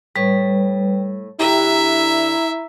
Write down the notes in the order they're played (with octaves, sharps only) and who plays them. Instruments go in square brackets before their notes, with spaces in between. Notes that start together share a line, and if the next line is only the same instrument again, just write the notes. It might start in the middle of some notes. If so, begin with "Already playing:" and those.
[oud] A2 [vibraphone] G3 B4
[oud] D3 G4 [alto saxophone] E4 [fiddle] E5 [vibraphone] A#5